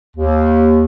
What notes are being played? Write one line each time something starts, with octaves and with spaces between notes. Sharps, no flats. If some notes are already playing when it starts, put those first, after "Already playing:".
D#2